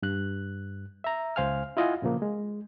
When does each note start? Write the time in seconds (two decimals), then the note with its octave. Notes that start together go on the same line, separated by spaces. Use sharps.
0.03 G2 F#6
1.04 E5 A#5
1.36 C#2 C5 F5 G#5 F6
1.77 E4 F4 D#5 F5 F#5 G#5
2.02 A#2 C#3 F3 A#3
2.22 G#3